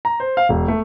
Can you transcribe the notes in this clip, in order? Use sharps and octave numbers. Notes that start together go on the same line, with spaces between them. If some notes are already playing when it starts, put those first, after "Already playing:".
A#5
C5
F5
E1
A3